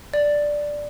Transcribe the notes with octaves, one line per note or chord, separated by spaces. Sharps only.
D5